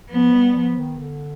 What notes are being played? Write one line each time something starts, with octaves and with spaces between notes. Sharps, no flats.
F3 B3
G3
F3
D#3
D3